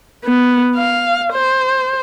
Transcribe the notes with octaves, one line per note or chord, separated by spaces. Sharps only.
B3
F5
C5